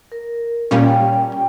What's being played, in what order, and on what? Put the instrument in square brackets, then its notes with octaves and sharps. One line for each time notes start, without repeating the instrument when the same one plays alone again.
[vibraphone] A#4
[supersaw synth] A#2 G3 C#4 [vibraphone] F5
[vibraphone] G5
G5